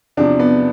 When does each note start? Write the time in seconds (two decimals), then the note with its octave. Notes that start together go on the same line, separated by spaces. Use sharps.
0.17 E2 C3 F3 D4
0.39 B3